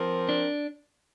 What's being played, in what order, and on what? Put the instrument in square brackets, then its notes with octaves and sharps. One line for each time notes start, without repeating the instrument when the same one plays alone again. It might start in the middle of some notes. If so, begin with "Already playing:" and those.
Already playing: [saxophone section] F3 C4 A#4
[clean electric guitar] D4